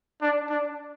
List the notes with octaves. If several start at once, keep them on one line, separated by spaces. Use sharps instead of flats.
D4
D4